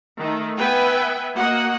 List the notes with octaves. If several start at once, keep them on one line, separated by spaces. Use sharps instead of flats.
D#3 A3
B3 B4 E5 G5 G#5
A#3 F#4 D#5 F#5